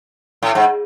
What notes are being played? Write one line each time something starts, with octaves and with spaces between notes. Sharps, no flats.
A2
G#2